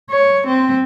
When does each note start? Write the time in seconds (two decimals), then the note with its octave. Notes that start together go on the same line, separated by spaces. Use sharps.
0.10 C#5
0.47 C4